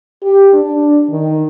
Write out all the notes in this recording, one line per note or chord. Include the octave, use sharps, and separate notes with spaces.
G4
D4
D#3